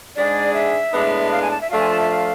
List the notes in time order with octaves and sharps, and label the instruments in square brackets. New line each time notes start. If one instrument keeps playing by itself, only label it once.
[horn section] G#2 G#3 D4 G#4 [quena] D5
[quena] E5
[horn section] A2 G#3 B3 D4
[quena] F5
G#5
A5
E5
[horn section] F3 A3 D4 F4 [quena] F5
[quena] G#5
A5
E5
F5